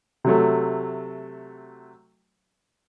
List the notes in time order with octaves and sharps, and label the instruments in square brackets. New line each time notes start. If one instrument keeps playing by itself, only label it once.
[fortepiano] C3 F#3 A3